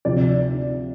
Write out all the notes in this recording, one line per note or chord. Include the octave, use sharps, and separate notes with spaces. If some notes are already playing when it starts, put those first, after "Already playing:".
D2 C3 F3 D5